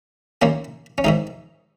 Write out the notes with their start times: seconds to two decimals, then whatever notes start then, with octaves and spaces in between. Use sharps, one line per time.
0.42 D#2 D#3 A#3 C#4
0.98 C#4
1.04 G#2 D#3 G#3 D#4